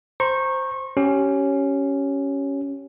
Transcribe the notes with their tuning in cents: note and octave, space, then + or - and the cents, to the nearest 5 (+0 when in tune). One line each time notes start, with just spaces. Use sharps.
C5 +0 A#5 +0 C#6 -25
C#4 +0 G4 -25